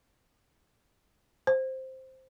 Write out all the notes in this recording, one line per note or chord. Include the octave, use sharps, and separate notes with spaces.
C5